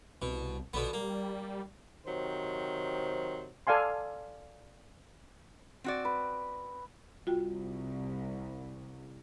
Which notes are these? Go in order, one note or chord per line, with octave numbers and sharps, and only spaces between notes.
C2 B2
A#1 B2 D3 B3
G3 A#3
C3 D#3 F#3 C5
A4 D5 F5 G#5 C6
C4 F#4 D5
B4
C2 F4 F#4 G5